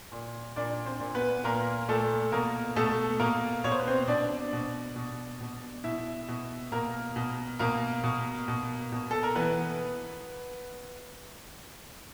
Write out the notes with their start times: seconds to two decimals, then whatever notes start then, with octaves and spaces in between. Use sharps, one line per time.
0.12 A#2
0.56 A#2 D4 D5
0.86 C4 C5
1.00 A#2
1.15 B3 B4
1.44 A#2 A#3 A#4
1.88 A#2 A3 A4
2.32 B2 A#3 A#4
2.76 B2 A3 A4
3.20 B2 A#3 A#4
3.64 B2 C#5
3.72 C5
3.80 B4
3.88 C4 C5
4.08 B2 D4 D5
4.53 B2
4.96 B2
5.41 B2
5.84 B2 E4 E5
6.28 B2
6.72 B2 A#3 A#4
7.16 B2
7.59 B2 A#3 A#4
8.03 B2
8.48 B2
8.92 B2
9.11 A4
9.23 A#4
9.35 E3 B3 B4